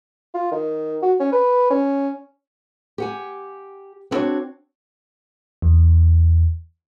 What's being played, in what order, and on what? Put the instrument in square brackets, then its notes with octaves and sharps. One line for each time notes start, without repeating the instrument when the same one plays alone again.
[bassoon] F4
D#3
F#4
C#4
B4
C#4
[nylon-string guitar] G4 F#5 G#5
B3 C4 D4 F#4 C5 C#5
[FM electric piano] E2